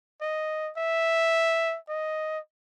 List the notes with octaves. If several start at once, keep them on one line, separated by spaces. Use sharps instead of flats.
D#5
E5
D#5